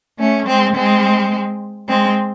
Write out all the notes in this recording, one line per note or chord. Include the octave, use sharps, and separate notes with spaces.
A3 C#4
G#3 C4
G#3 C4
G#3 C4